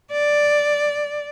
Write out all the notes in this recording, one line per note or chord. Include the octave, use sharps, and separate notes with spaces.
D5